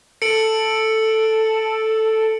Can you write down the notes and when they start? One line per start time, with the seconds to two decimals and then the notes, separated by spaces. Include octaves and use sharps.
0.22 A4 C#7 D7 F#7